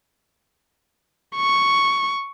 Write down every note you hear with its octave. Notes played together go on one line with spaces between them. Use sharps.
C#6